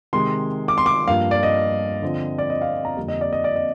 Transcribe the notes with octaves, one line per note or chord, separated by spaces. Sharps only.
C3 D#3 G#3 C6
D6
C6
D6
G2 F3 A#3 F5
D5
D#5
D3 F3 C4
D5
D#5
F5
A#5
F2 D3 G3 A#3
D#5
D5
D#5
D5
D#5